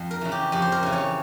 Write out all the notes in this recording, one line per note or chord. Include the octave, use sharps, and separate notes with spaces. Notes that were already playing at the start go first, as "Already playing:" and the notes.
Already playing: F2
A#4
C#3 E3
G4
F2 G4
C5
A#4
C#3 E3
C#5